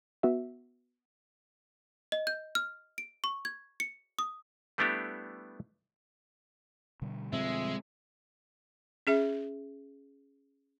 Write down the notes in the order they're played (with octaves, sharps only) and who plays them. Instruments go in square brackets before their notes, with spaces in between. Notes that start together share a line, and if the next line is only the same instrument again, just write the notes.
[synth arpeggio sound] B3 F#4 E5
[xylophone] D#5
G6
F6
D7
C#6
G#6
C#7
D#6
[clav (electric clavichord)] G3 A3 B3 D4 E4 G4
[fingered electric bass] B2 D3 G3
[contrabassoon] F2 [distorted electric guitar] G#3 [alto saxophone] E5
[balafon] C#4 G#4 E5